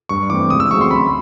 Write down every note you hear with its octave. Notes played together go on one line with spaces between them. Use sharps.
G2 C#6
E3 A3 C4 D6
C#2 D#6
E6
C#3 F#3 A3 C4 C#6
C6
D2 B5